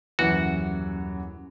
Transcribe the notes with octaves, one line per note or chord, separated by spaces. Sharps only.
D#1 F#2 E3 F#4 F#5